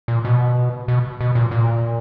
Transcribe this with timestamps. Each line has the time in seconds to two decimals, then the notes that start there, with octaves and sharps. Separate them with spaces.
0.08 A#2
0.25 B2
0.88 B2
1.21 B2
1.35 A#2
1.51 A#2